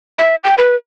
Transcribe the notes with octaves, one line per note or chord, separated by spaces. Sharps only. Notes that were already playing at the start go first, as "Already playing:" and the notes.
E5
G5
B4